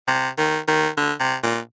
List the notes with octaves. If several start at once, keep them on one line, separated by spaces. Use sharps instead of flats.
C3
D#3
D#3
D3
C3
A#2